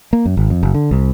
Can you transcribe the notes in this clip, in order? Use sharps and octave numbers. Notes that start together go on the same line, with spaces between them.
A#3
F#2
G#1
F2
F#1
D3
C2